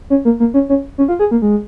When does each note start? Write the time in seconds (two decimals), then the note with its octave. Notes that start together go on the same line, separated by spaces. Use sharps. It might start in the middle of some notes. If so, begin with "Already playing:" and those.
0.10 C#4
0.25 A#3
0.40 A#3
0.54 C#4
0.69 C#4
0.98 C#4
1.09 F4
1.19 G#4
1.31 A#3
1.42 G#3